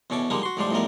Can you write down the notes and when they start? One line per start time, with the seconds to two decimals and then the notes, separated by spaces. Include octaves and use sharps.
0.10 E2 B2 C#4 A4 D6
0.30 D3 F3 G3 G#3 A#3 D#4
0.43 F#4 C6
0.57 A1 G#2 F3 G3 D4 C5
0.71 A1 E2 G#2 F3 G3 A#4